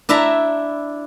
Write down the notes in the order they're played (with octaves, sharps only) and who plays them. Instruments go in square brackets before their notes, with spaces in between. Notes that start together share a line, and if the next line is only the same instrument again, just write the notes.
[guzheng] D4 E4 E5 A5 A#5